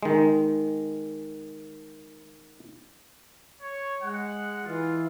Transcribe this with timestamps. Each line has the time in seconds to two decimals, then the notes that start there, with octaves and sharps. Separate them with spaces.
0.03 D#3 G#3
3.61 C#5
4.03 G#3 F#5
4.65 E3 F4